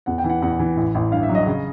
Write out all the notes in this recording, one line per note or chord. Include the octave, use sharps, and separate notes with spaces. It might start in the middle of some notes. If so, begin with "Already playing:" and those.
E2 F#5
G5
E3
F#5
E2 F#5
E3
A1
A1
G2 F5
E5
F#3
D#5
C#3